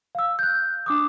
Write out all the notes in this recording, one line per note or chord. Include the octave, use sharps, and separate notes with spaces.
F5 E6
F#6 G6
D4 D6 D#6